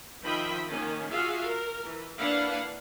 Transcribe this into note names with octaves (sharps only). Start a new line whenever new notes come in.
D#3 F3 D#5 E5 G5 B5
D#3 A#3 C#4
F4 F#4 G#4 E5 F5
A#4
E3
A#3 D4 E4 B4 F5 F#5